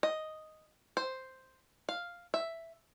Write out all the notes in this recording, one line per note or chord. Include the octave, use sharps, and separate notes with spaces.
D#5
C5
F5
E5